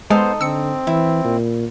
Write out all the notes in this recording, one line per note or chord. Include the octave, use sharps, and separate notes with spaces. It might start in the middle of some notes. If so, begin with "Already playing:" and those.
G#3 B3 D#4 A4 C5 C6
D3 C4 E6 C#7
E3 E4
A#2